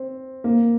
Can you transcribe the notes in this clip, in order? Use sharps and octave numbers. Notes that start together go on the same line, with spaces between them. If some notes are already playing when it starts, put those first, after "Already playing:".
Already playing: C4
A#3